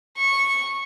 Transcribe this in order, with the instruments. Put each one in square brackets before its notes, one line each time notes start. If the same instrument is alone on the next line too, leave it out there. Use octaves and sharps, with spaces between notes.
[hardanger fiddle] C#6